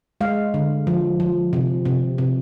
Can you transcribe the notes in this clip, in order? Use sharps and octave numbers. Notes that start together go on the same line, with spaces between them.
G#3 F5
D3
F3
F3
C3
C3
C3